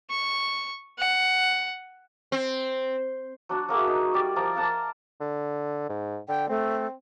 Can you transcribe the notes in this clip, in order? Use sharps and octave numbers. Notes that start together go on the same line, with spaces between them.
C#6
F#5
C4
F#3 D4 F#4
F#3 A#3 G#4 E5
D#4
G3 D5
F3 A#4 D5 A#5
F5 F#5 A5 A#5
D3
G#2
D3 G5
A3 C4